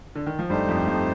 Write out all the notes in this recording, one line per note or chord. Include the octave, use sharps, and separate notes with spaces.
D3
D#3
F3
G2 G3 A3 D#4 G4 C5
F2 F3
F2 F3